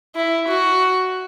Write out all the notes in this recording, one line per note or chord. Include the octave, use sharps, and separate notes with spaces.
E4
F#4